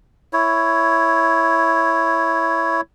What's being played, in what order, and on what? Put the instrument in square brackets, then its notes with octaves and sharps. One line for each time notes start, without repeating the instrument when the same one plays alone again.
[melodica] E4 C#5